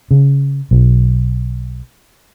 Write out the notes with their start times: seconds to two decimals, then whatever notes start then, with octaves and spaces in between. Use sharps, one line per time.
0.11 C#3
0.71 B1